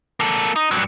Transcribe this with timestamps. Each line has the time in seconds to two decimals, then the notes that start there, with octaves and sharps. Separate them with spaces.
0.20 A#3 A4
0.56 D#4
0.71 G2 F#3